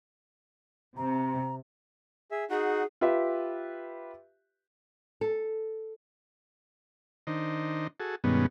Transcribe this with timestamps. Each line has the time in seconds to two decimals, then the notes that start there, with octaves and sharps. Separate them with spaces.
0.97 C3 A#5
2.31 G#4 E5
2.50 D#4 F#4 G#4 F#5
3.01 F4 G4 B4 E5
5.21 A4
7.27 D#3 D4 D#4 C5
8.00 F#4 G#4 A4
8.24 G2 B2 D#3 G#3 B3 C#4